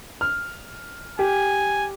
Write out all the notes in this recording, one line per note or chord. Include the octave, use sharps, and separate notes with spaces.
F6
G4 G#5